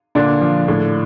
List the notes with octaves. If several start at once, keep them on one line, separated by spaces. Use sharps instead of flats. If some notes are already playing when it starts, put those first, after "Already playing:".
A#2 D3 D4
F3
A2